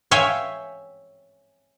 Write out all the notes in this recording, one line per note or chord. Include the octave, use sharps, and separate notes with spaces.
C#5 E5 F5 G5 G#5